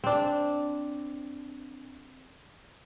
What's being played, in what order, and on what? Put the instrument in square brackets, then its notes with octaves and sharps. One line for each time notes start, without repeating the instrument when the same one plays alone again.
[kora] C4 D4